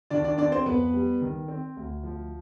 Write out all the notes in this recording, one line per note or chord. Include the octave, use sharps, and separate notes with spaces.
D#3 D4 D5
D4 D5
C4 D4 D5
C4 C5
F2 B3 B4
G3
D#3
C4
D2
F3